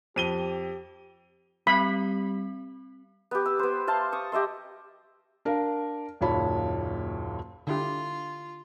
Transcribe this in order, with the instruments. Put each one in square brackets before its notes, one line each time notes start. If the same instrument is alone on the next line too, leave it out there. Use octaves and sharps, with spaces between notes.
[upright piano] F2 D#7 G7 [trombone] G4
[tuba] G3 [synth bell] C4 [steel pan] B5
[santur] B3 G4
E6
B3 C5
C5 F5 A5 C6
C#6 D#6
G4 D#5 E5 C6
[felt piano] D4 A#4 F5
F#1 D#2 A#2 C#5 A5 B5
[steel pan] D3 E4 G4 [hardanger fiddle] F4